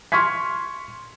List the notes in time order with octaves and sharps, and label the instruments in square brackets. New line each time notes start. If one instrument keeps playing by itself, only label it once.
[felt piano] C6 C#6 F6 G#6 B6